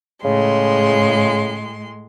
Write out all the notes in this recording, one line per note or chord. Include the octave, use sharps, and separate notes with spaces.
A2 C#3 G#3 C6